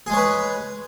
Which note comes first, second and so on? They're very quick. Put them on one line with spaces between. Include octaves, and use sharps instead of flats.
G#4 G#3 C#5 B4